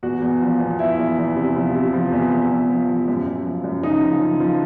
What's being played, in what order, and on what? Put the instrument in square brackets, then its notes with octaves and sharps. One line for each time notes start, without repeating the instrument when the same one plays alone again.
[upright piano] E2 F#4
E2
F3
E2
E2 E4
E2
E2
C3
F3
C3
F3
E2
E2
F3
F3
F3
F#2
F#2
F3
F#2
C#3 D#4
F3
C#3
F3